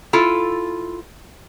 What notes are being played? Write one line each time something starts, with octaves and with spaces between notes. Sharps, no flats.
E4 F4 A4